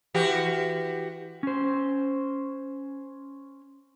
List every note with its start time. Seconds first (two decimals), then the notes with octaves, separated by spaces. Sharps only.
0.14 E3 F#4 G4
1.43 C#4 C5